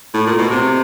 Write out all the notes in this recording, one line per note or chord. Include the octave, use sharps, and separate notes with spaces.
A2
A#2
B2
C3